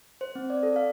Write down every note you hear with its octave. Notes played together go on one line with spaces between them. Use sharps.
C5
C4
D5
A4
F5